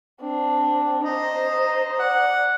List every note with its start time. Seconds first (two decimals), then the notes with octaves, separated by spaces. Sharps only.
0.21 C4 D4
1.05 C5 D#5 A#5
2.00 D5 F#5